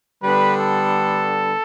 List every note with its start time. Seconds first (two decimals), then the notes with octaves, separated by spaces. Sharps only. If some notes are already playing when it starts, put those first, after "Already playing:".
0.23 D3 G3 B3 D4 B4
0.56 A4